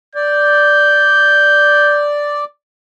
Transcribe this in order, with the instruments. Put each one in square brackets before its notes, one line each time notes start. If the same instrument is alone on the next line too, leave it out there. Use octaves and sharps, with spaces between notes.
[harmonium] D5 [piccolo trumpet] G6